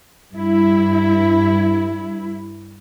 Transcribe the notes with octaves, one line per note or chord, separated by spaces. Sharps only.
G2 E4